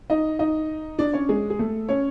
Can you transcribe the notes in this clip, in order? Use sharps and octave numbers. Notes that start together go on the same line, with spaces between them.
D#4 D#5
D#4 D#5
D4 D5
C#4 C#5
G#3 G#4
G#4
A3 A4
C#4 C#5